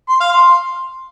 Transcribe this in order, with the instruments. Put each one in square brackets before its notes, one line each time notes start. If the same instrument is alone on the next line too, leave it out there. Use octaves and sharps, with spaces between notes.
[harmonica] C6
F5
C6